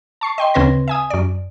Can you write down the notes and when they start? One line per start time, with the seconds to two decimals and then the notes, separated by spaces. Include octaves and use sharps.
0.21 A5 C#6 C7
0.38 D#5 G5 C6
0.54 D2 C#3 C4 B4 C6 A#6
0.88 E5 G#5 D#6
1.10 F#2 D5